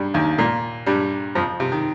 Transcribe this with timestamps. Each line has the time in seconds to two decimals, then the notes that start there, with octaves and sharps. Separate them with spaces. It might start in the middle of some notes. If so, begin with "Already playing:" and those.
Already playing: G2 G3
0.14 D#2 D#3
0.38 A#2 A#3
0.86 G2 G3
1.35 F2 F3
1.60 C3
1.72 D#3